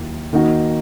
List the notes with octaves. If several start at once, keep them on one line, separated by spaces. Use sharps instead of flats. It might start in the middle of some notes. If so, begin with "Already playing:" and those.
Already playing: D#2 F#3 A#3 E4
D#3 A#3 D#4 F#4